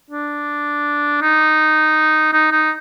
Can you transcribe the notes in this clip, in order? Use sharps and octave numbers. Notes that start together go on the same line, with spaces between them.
D4
D#4
D#4
D#4